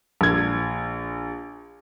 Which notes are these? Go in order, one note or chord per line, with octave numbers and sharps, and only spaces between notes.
A#1 G#6